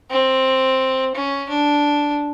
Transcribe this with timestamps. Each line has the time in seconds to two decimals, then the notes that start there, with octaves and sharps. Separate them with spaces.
0.10 C4
1.15 C#4
1.50 D4